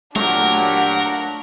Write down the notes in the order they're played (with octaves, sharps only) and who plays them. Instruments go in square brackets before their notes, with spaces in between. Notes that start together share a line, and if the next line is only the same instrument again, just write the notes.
[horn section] A#2 F#3 G4 [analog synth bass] A3 [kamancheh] D4 F#5 [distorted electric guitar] A#4